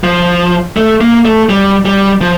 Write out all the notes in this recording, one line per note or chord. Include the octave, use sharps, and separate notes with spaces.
F3
A3
A#3
A3
G3
G3
F3